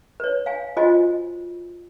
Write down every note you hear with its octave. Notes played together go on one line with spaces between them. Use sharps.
B4 C#5
F5 G#5
F4 F#4 C5 D#5 G#5